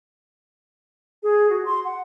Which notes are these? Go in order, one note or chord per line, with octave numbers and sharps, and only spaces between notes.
G#4
F#4
C6
F#5